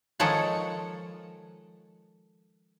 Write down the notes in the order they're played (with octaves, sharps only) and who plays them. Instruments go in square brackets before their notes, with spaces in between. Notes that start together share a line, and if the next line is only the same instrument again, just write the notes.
[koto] D#3 F3 G#3 A4 C#5 F#5